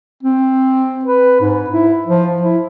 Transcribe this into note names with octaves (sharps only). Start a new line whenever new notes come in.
C4
B4
G#2
E4
F3
E4